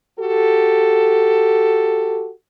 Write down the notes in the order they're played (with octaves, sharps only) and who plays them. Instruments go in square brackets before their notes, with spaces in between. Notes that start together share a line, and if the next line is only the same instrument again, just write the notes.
[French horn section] F#4 G4 A4